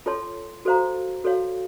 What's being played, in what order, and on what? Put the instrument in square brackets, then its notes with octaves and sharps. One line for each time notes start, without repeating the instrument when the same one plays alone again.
[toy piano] F4 A4 C#5 A5 C6
F#4 A4 C5 F5 A#5
F#4 A4 C#5 F5